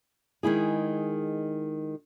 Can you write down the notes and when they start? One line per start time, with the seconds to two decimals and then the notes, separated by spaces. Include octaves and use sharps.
0.43 D#3 G#3 E4 G#4